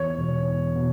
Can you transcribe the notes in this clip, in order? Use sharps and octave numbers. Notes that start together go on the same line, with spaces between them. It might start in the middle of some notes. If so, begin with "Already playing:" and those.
Already playing: E2 C#5
E1
E2
B2